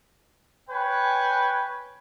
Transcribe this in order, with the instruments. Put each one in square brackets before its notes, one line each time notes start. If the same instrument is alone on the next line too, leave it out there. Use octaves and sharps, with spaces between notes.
[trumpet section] B4 C#5 G5 G#5